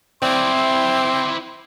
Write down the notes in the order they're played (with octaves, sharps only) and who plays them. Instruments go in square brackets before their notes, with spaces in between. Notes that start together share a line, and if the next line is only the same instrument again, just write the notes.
[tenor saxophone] C4 [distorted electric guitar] E4 D5 [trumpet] C6